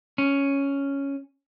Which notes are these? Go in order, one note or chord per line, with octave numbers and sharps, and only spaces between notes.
C#4